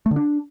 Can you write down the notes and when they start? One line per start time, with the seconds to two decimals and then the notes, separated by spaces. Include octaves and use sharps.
0.06 A3
0.11 D3
0.16 D4